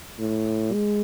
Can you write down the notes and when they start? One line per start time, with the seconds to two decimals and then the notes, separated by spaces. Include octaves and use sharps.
0.19 A2
0.73 G#3